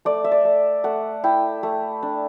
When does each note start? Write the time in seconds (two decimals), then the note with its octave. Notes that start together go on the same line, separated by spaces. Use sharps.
0.05 A3 D5
0.24 E5
0.32 D5
0.45 A3
0.84 A3 F#5
1.24 E4 G5
1.63 A3
2.03 D4